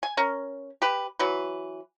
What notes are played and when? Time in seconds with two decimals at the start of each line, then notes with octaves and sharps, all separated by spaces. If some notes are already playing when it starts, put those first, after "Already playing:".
0.03 G#5
0.17 C#4 A#4
0.82 G4 B4
1.19 E3 F#3 B4